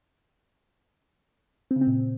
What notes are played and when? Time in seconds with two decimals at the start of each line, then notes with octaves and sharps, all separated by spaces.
1.71 C4
1.76 C#3
1.81 C4
1.87 A#2